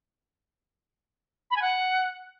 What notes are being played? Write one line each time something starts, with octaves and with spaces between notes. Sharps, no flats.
B5
G#5
F#5